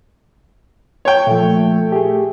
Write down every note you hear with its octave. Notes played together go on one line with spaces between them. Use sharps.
C#5 G5
A#2 F3 A3
G4 G#4